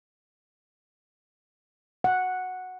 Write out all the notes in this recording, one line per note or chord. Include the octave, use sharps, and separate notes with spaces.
F#5